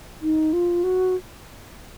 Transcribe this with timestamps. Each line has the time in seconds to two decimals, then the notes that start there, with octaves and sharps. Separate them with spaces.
0.22 D#4
0.53 F4
0.84 F#4